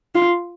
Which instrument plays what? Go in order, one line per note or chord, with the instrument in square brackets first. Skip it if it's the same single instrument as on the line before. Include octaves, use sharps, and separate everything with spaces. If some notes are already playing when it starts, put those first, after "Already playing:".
[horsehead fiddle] F4